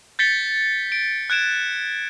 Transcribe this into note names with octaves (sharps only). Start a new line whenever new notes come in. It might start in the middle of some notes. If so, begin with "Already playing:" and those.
G6 A6 B6 C#7 G7
D7
F#6 G#6 D7 E7